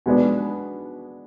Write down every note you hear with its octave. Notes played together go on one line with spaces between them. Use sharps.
B2 G#3 B3 D4